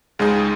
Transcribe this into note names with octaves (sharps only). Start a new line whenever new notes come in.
C#2 C#3 G#3 D#4 G#4